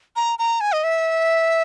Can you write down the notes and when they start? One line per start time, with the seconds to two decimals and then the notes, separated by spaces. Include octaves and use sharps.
0.16 A#5
0.39 A#5
0.61 G#5
0.72 D#5
0.84 E5